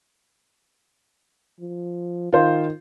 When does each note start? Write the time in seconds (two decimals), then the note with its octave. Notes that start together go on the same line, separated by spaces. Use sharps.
1.60 F3
2.33 D#3 F4 C5